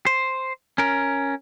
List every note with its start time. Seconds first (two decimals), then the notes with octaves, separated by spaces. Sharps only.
0.06 C5
0.78 C#4 A#4